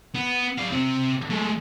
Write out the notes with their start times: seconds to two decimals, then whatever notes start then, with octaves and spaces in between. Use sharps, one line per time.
0.15 B3
0.59 D4 F5
0.72 C3 C4
1.31 G#3 A3